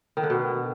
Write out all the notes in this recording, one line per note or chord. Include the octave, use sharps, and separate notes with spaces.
D#3
D3
B2